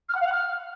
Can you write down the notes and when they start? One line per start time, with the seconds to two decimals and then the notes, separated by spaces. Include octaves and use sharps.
0.09 F6
0.15 F#5
0.21 F5
0.26 F#5
0.32 F6